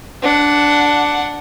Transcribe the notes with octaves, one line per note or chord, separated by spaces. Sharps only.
D4 F#5